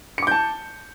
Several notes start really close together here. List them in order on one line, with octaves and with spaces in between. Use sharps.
C#7 D6 G6 A5